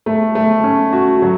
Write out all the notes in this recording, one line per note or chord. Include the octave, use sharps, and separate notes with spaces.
A3
A3
C#4
F#4
F#3